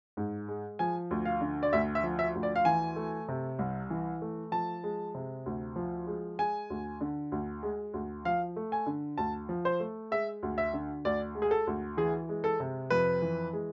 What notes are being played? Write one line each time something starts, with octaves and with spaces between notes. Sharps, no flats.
G#2
G#3
F3 G#5
D2
F5
D3
D5
D2 E5
E5
F3
E5
D2
D5
F5
E3 G#5
A3
C3
C2
E3
A3
F3 A5
G#3
C3
D2
F3
G#3
G#3 G#5
D2
D3
D2
G#3
D2
F3 F5
A3
G#5
D3
D2 A5
F3
C5
A3
G#3 E5
D2
E5
D3
D2 D5
G#3
G#4
A4
D2
E3 G#4
G#3
A4
C3
F2 B4
E3
G#3